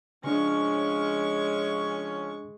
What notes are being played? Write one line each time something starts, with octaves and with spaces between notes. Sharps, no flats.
C#3 F3 G#3 C#4 D4 C#6